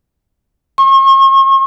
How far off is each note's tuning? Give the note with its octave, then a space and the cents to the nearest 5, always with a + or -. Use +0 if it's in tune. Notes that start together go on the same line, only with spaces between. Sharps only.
C#6 -45